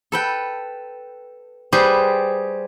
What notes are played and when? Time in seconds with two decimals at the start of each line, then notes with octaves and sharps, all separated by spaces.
0.12 A4 B4 G5
1.72 G3 G4 G#4 B4 C5